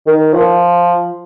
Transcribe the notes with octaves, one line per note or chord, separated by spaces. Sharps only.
D#3
F3